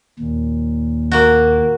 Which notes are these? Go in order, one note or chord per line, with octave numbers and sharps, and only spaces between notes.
D#2 A#2
A#3 F#4